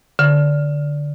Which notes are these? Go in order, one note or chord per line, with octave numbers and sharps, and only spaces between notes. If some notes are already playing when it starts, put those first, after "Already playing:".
D3